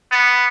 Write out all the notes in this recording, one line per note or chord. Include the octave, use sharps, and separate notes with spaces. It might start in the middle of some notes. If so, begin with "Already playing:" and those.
B3